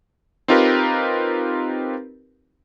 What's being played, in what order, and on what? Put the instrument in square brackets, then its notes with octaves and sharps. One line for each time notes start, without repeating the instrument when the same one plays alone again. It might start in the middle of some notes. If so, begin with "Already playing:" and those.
[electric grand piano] C4 D#4 F4 G4 A#4 B4